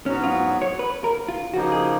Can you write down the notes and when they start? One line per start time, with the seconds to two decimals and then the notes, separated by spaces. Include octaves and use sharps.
0.06 G#2 F#3 B3 C#4 F#4
0.24 F4
0.62 C#5
0.79 B4
1.04 A#4
1.28 F4
1.53 C#3 F3 A#3 D#4 F#4
1.72 G#4